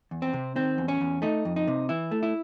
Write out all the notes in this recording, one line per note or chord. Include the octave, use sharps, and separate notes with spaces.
E2
C4
C3
D#3 C4
E2
C#4
E2
A3 D#4
F2
D#4
C3
E3 E4
A3
E4